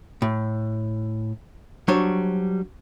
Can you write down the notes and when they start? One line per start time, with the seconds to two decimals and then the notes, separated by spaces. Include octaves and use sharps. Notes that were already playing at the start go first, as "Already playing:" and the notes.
0.22 A2
1.88 F#3 G3 D4 C5 C#5